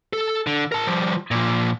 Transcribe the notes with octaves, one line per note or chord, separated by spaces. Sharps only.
A4
D3
A#4 A5
F3 G3
A#2 F3